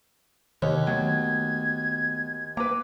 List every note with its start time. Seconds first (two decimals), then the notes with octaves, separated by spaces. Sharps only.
0.62 D#2 C3 D#3 C#5
0.87 D#3 F#3 A3 B3 F#4 G#6
2.57 A#3 B4 A#5 D6